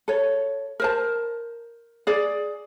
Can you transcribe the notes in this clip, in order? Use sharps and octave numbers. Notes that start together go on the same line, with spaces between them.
A4 C#5
A#4 C5 A5
G#4 D5